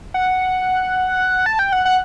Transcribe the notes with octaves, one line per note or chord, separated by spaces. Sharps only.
F#5
A5
G5
F#5
F#5